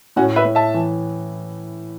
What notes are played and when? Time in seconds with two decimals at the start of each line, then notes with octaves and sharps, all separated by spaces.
0.16 A2 C#4 F#4
0.36 B4 E5
0.45 A2
0.55 E5 A5
0.74 E3